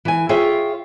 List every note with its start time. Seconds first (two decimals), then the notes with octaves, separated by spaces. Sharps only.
0.05 E3 G#5
0.29 F4 G#4 C#5 E5 G5